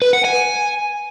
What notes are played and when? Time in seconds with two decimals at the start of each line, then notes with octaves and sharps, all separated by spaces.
0.02 B4
0.13 F#5
0.25 G#5